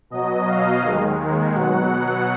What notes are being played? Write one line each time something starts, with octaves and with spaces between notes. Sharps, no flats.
B2 F#3 D#5
F5
D#2 D#3 G#3
B2 F#3 F#5